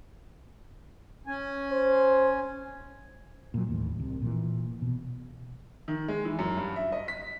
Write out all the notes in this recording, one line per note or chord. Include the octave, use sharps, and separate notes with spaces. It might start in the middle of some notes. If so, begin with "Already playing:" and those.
C#4 G#5
C5
A#2 F#3
A1 D#2 A2
C2 C3
A#2 E3
B2
D#3
G#3
E3
F#2
G2
E5
D#5
B6